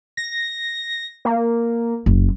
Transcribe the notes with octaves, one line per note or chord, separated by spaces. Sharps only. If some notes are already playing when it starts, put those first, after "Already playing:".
A#6
A#3
F#1